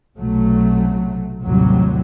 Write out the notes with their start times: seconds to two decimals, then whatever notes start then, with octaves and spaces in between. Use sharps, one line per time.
0.17 B1 C3 F#3 A3
1.43 A1 D#2 A2 C3 F#3 G3